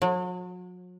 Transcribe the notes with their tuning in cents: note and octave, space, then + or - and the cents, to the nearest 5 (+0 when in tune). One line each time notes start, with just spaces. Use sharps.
F#3 -40